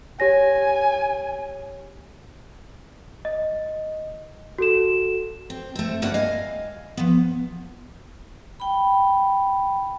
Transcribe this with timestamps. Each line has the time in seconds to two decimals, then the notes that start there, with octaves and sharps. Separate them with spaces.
0.20 G4 C#5 G#5 A#6
3.25 D#5
4.58 F#4 A4 E7
5.50 C4
5.75 A3 C4
6.02 D2 G2 A#3 D4 F#4 F#5
6.14 G3 D#5 F5 G#5
6.97 F3 B3
8.60 G5 B5